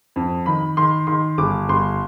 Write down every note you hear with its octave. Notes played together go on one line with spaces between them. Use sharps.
F2
D#3 B5
D#3 C6
D#3 C6
G1 D6
G1 C6